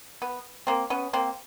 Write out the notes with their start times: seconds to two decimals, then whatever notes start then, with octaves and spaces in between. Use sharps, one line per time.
0.22 B3
0.67 A#3 C4
0.90 B3 C#4
1.13 A#3 C4